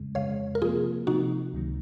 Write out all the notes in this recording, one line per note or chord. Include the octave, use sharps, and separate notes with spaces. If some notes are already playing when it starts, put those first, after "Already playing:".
Already playing: F2 C#3 G#3
F2 C#3 G#3 C#5 F5
A#4
C3 F3 A#3 F4 G#4
C3 F3 A#3 D#4 F#4
C#2 C3 D#3 F#3